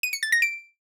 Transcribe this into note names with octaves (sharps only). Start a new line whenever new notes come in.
D#7
C#7
A6
A#6
D7